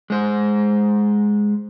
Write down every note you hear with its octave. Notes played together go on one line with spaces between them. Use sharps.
G#3 C5